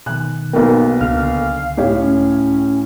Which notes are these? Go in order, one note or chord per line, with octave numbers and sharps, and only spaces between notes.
B2 D#3 G#5 F#6
B1 A#3 B3 D#4 A#4 B4 G5
C#2 D3 F5 F6
A2 G4 C#5
C#4